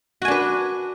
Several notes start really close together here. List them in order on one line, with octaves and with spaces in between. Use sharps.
F#4 G#5 D4 B4